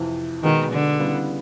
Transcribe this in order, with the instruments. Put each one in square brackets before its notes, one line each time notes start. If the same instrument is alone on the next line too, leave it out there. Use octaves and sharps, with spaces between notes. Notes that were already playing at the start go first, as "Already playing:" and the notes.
Already playing: [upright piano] F2 C3 E3
[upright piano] B2 G#3 B3 D#4 F#4 [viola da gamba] D#3
[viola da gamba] D3
[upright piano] C#3 E3 G3 B3